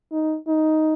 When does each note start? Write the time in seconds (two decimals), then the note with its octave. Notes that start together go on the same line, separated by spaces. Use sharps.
0.12 D#4
0.48 D#4